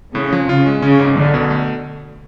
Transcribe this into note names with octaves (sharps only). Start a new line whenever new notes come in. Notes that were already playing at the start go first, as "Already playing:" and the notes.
A2 C#3
F3
C#3 F4
G#3
C#3 C#4
G#2
B1 D3
B2
A3